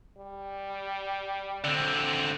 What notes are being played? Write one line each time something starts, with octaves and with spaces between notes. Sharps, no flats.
G3
D3 C4